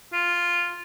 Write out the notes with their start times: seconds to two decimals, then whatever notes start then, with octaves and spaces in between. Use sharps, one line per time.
0.13 F4